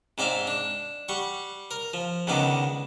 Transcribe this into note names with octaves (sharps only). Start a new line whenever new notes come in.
G#2 C4 D5 E5 F5
D4
G3 F#5 C#6
A#4
F3
C#2 D3 D#3 B3 D5